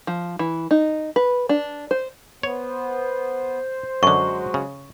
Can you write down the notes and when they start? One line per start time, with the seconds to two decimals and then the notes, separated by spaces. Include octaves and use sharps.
0.07 F3
0.39 E3
0.71 D#4
1.16 B4
1.49 D4
1.91 C5
2.43 B3 C5 C#5
4.03 F#2 D3 F#3 G#3 F#4 C#6
4.54 C#3